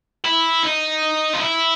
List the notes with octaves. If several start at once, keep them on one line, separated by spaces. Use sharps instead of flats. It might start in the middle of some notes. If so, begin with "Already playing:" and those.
E4
D#4
F4
E4